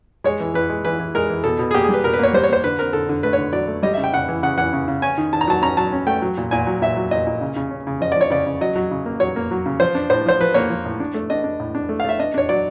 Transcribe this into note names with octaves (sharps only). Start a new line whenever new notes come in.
G#3 C#5
E3
E3 B4
G#3
E3 B4
E3
G#3 A#4
E3
B2 A4
B2
G#4
A#3 G4
G#4
G3
B4
B2 A#4
B4
A#3 C#5
G3 C5
C#5
A#3 C5
D3 B4
C4 A#4
D3 A4
D3
A3 B4
C#5
D3
F#3 D5
A3
G3 D#5
E5
C#3
G5
C#3 F#5
E3
C#3 F#5
E3 F#5
C#3
C#3
C#4 G#5
D#3
D#3 A5
A#5
F#3 A5
C#4 A#5
F#3 A5
C#4
A3 G5
F#3
A#2
A#2 G#5
F#3
A#2 E5
F#3
A#2 D#5
A#2
C#3
C#3
C#4
C#3
F3 D#5
D5
F3
C#5
C#3 D5
C#3
F#3 D#5
F#3
C#3
A#3
F#3 C#5
A#3
F#3
C#3
F3 C5
D4
A2 C5
F3 C5
F3 B4
A#3 C#5
F3
A2
D4
A3
D4 D#5
D4
A2
D4
A3
F5
A3 E5
D4 D#5
D4 C#5
F#3 D5